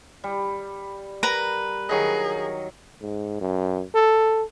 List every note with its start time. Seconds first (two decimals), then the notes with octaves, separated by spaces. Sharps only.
0.24 G3
1.23 A#4 B4 A#5
1.89 D#3 F#3 G#4 D#5
3.02 G#2
3.41 F#2
3.95 A4